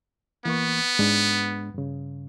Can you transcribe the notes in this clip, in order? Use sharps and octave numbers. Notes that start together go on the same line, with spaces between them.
E3 A#3 B3 C#6
G#2 G#3 D4
G2 C#3